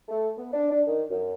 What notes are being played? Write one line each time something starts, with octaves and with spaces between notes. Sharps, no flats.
A3
B3
D4
D4
D#3
F#2